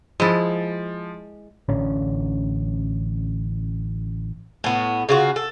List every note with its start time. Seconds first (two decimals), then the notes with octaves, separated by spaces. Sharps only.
0.20 F3 G#3 E4 A6
1.69 A1 D3 C#4
4.64 A2 B3
5.09 C#3 F4 F#4
5.36 A4